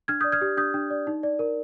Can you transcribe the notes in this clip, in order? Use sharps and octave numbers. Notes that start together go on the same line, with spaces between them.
D4 F6 G#6
D#6 G6
D5
F6 G#6
G4
D4 D#6 G6
D4
D5
D#4
D5
A#4